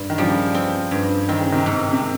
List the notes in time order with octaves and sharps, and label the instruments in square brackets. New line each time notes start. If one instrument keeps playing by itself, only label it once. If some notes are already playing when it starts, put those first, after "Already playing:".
Already playing: [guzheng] G2
[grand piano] D#3
[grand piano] C#3 F3 [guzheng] G3
[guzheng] C4
G2
[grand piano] D#3 [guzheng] C4
[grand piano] C#3
C3 D#3
[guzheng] G#2
[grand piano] C3